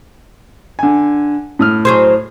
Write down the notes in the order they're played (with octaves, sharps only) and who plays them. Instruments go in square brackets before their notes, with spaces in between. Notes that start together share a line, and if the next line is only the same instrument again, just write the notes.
[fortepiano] D3 G#5
A2 D#6 F6
[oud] F#3 G#4 C5